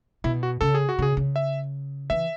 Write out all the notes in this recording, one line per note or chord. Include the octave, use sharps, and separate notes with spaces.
B2 E4
F#4
C#3 A4
G#4
F#4
C#3 G#4
C#3
E5
E3 E5